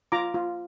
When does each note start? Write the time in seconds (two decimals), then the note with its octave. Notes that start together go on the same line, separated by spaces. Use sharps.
0.12 F4 A#5 D6
0.34 F4